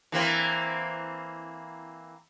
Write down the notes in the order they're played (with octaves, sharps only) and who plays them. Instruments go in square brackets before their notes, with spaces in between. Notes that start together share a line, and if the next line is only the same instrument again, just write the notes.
[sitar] E3 A#3 C4